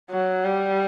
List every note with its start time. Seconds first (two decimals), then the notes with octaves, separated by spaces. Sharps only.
0.11 F#3
0.44 G3